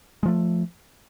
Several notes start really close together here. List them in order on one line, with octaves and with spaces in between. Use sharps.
G#3 F3 A3